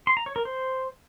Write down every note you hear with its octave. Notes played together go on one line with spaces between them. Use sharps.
C6
A#5
C#5
A#4
C5